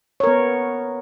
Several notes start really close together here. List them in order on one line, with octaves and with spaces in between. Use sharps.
C#5 A#4 B3